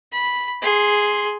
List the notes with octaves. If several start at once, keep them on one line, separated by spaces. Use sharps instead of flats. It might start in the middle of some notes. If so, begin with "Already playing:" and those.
B5
G#4 C6